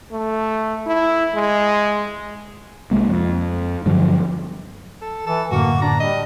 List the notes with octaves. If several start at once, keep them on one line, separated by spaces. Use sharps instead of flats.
A3
E4
G#3
C2 G#3 A#3
F2
G2 D3 F3 F#3
A4
E3 A4
F#2 A2 D3 A#3 F#4
D4 A#5
G3 D#5